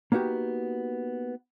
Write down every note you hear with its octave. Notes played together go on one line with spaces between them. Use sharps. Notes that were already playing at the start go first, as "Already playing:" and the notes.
A#3 B3 D#4 F#4 G4